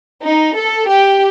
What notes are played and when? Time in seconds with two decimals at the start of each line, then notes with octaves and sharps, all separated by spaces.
0.22 D#4
0.55 A4
0.88 G4